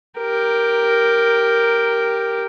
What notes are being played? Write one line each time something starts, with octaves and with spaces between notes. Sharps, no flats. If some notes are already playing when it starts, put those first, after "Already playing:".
G4 A#4